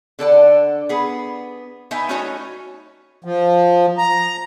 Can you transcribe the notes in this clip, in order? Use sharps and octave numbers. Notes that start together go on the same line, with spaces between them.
D3 A4 D5 F#5
B3 G#4
B3 D#4 D#5 E5 G5 G#5
A3 C#4 D#4 F#4 C#5 G#5
F3
A#5